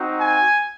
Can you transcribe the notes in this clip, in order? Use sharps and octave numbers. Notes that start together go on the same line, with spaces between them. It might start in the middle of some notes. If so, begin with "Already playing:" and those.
Already playing: C4 D#4 F#4
G#5